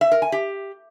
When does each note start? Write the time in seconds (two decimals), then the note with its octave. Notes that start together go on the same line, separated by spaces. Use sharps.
0.01 E5
0.12 A#4
0.22 G#5
0.32 G4